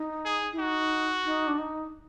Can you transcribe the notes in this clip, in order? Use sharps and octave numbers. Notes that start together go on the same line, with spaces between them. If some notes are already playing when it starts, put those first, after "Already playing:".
Already playing: D#4
G#4
E4
D#4 F#4
D#4
D4
D#4